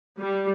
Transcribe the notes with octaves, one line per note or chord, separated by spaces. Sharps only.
G3